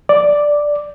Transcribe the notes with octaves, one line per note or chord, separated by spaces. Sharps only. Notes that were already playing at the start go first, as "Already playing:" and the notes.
D5